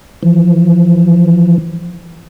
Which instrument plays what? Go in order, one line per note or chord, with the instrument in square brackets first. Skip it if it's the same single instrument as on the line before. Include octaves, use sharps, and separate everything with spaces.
[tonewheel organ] E3 F3